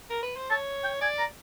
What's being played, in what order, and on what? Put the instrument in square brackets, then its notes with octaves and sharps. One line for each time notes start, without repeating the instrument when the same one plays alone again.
[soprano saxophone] A#4
B4
C5
[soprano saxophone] C#5 [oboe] A5
[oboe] G5
[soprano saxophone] D5 [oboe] G#5
[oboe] A#5